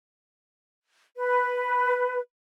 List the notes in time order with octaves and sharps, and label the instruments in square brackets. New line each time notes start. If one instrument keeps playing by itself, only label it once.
[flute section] B4